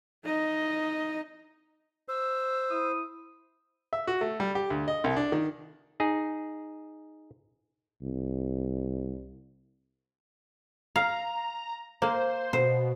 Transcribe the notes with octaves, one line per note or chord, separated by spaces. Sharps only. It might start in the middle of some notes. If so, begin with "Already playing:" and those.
D#4 D#5
C5 E6
E4 D#6
E5
F#4
A3
G3
G4
D2
D#5
C2
D4
D#3
D#4 G#4
C2
F5 A#5
A#3 C5
B2 C5